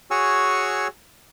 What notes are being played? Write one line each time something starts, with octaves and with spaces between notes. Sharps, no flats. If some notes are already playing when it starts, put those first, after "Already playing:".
F#4 G#4 C#5 G#5 C#6 E6